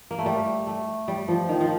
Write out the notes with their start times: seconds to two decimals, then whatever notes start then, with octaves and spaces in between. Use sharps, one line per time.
0.11 A#3
0.18 A3
0.26 G3
0.67 A3
1.08 G3
1.28 F3
1.49 D#3
1.61 F3